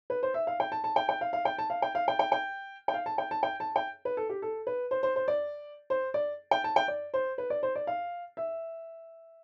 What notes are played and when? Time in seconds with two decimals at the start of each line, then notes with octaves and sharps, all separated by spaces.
0.10 B4
0.23 C5
0.34 E5
0.47 F5
0.60 G5
0.72 A5
0.84 A5
0.96 G5
1.09 G5
1.21 F5
1.33 F5
1.45 G5
1.58 A5
1.70 F5
1.82 G5
1.95 F5
2.08 G5
2.19 G5
2.32 G5
2.88 G5
2.94 F5
3.06 A5
3.18 G5
3.31 A5
3.43 G5
3.60 A5
3.76 G5
4.05 B4
4.17 A4
4.29 G4
4.42 A4
4.67 B4
4.91 C5
5.03 C5
5.16 C5
5.28 D5
5.90 C5
6.14 D5
6.51 G5
6.64 A5
6.76 G5
6.88 D5
7.14 C5
7.38 B4
7.50 D5
7.63 C5
7.75 D5
7.87 F5
8.37 E5